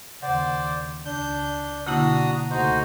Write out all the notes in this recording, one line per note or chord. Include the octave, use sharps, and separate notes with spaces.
D#2 C#3 C5 D5 F#5
C#2 D4 G6
B2 D3 A#3 D4 E4 F#4 A#5 D#6
C#2 A3 D#4 F#4 C5